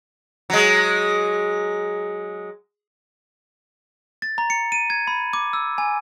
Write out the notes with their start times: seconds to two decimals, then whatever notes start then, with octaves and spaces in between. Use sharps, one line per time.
0.50 F#3 G#3
4.22 A6
4.38 A#5
4.50 C#7
4.72 D#7
4.90 G#6
5.07 B5
5.33 D6
5.53 E6
5.78 G#5